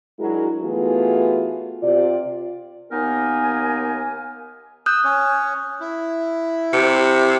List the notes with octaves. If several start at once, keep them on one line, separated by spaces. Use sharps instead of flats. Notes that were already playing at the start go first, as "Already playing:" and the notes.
F#3 G#3 D4 E4 F#4 A#4
E3 A3 B3 F4 F#4 G#4
C3 F4 D5
D#2 A#3 B3 D#4 A#4 G#5
D#6 E6 F#6 G6
C#4 C#5
E4
C3 C#7 D7